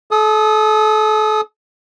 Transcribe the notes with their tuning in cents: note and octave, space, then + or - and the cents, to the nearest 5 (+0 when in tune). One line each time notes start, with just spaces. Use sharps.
A4 -35 D#6 +0